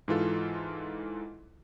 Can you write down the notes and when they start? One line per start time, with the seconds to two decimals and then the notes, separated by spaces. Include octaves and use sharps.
0.08 G#2 E3 F4 A4